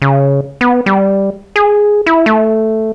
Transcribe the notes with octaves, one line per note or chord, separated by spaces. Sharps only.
C#3
B3
G3
G#4
E4
A3